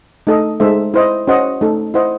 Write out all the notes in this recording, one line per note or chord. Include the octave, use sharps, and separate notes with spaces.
A3 D#4 A4 D#5
G#3 D#4 A4 C5 E5
E4 C5 D#5
C#4 F#4 C5 D#5 F#5
A3 D#4 A4
E4 C5 D#5 F#5